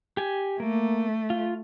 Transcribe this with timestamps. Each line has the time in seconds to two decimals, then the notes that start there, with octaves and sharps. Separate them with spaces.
0.17 G4 G#5
0.60 A3 A#3
1.30 F4